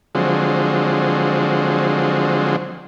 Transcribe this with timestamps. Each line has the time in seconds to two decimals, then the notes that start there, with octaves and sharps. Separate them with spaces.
0.15 D3 F3 F#3 G#3 C4